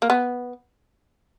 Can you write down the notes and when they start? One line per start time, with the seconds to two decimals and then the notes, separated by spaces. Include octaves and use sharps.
0.02 A#3
0.10 B3